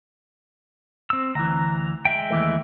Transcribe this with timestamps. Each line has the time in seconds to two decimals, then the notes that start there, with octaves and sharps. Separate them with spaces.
1.10 C4 E6
1.35 D2 E3 A#5
2.05 G#3 E5 G5
2.30 D#2 E3 A3